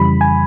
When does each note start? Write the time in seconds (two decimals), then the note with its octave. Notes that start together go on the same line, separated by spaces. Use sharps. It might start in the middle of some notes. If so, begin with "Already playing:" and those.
Already playing: F2 C#3 E3 G3 B5
0.21 G#5